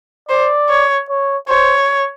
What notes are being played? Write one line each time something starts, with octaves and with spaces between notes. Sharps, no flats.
C5 D5
C#5
C#5
C5 C#5